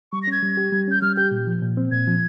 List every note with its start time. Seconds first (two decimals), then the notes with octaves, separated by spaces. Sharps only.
0.12 G3 C#6
0.23 A#6
0.27 C#4 G#6
0.42 G3
0.57 G4
0.72 G3
0.88 C#4 G6
1.02 G3 F6
1.17 G4 G6
1.31 A#2
1.47 F3
1.62 A#2
1.77 C4
1.91 A#2 G#6
2.07 F3